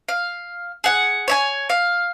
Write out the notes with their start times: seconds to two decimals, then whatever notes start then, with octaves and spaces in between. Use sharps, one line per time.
0.08 F5
0.84 G#4 F#5
1.28 C#5 E5 G#5
1.70 F5